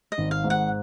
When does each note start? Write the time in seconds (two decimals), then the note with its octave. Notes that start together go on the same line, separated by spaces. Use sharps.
0.12 D#5
0.18 G#1
0.31 F5
0.44 G#2
0.50 F#5